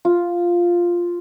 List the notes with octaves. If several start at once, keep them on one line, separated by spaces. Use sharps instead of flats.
F4